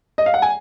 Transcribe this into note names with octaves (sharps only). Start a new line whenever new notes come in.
D#5
F5
F#5
G#5